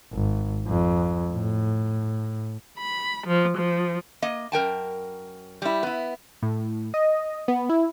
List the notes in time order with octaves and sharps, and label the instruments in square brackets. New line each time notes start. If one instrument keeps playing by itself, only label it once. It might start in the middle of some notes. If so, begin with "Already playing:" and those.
[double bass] G#1
F2
A2
[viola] B5
F3
F3
[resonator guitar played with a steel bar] A#3 D#5
F#2 A#4 G5 A5
G3 E4
B3 E4
[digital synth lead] A2
D#5
B3
E4